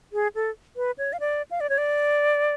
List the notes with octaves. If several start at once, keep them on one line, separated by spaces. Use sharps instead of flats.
G#4
A4
B4
C#5
F5
D5
F5
D5
C#5
D5